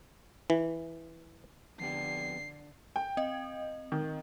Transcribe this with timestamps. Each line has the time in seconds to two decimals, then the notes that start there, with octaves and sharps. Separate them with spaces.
0.50 E3
1.80 F2 D3 B3 G4 C7
2.96 G5
3.17 C4 D#5
3.92 D#3